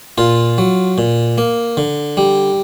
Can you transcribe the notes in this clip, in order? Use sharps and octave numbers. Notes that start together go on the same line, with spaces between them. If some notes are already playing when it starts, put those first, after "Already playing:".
A#2 F4
F#3
A#2
A#3
D3
G3